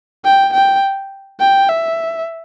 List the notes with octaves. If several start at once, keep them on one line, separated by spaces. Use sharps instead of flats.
G5
G5
G5
E5